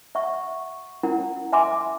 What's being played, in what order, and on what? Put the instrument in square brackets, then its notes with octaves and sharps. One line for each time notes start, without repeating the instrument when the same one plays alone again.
[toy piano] E5 F#5 C#6
C#4 E4 A#4 F#5
E5 G#5 C6 D6